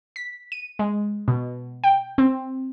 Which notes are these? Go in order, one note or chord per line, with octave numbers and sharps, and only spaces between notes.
B6
D#7
G#3
B2
G5
C4